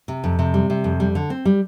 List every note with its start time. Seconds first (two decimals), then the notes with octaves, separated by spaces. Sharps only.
0.08 C3
0.24 F2
0.39 C3
0.54 G3
0.70 C3
0.84 F2
1.00 G3
1.15 D3
1.30 C4
1.45 G3